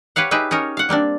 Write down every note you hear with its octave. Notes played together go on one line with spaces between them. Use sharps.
G4 B4 C#5 F5 F#5
D#4 G4 G#4 B4 E5
C#4 D#4 A#4 C#5
F5 F#5
G3 A#3 C4 D4